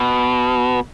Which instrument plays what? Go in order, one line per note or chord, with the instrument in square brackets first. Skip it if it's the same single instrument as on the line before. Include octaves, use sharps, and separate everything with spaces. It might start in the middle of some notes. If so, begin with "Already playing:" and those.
Already playing: [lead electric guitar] B2